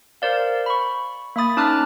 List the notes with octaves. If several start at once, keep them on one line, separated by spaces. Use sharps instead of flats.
A#4 C5 D5 F5
B5 C#6
A#3 E5 B5 D#6 A6
C#4 D#4 A5 D6 F6 F#6